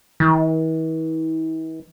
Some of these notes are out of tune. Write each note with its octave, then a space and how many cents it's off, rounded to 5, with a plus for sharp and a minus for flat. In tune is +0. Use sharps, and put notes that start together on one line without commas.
E3 -45